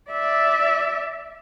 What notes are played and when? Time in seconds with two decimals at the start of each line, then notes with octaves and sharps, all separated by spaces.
0.11 D5 E5